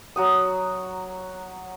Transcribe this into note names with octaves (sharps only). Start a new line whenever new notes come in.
F#3 F#4 D#6